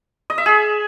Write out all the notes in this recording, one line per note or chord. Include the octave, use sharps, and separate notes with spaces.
D#5
E5
G#4